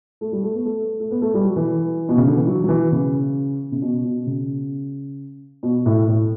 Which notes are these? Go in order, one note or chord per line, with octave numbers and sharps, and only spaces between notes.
A3
G3
A3
B3
A3
A3
B3
A3
G3
F#3
E3
B2
C#3
D3
E3
F#3
F#3
E3
C#3
C#3
B2
B2
C#3
B2
A2
A2